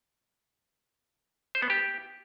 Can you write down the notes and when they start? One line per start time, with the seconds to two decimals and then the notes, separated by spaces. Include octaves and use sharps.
1.55 C5
1.62 B3
1.70 G4